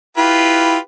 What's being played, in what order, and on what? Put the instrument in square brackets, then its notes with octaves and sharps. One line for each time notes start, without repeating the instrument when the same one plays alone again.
[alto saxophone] E4 [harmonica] F4 G4 B4